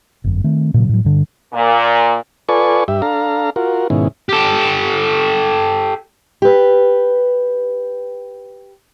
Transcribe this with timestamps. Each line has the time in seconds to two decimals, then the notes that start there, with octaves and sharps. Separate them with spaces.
0.24 G1 F#2
0.44 D#3 A3 C4
0.74 A#2 C#3 F#3
0.89 A2 F#3
1.05 G2 D3
1.53 A#2
2.49 F4 A4 B4 D5 G#5 C#6
2.88 G2 G4 E5
3.02 D4 A4 F5 A#5
3.56 F4 F#4 A#4
3.90 G#2 B2 D#3 C#4 E4
4.29 G4 A4
6.42 G4 B4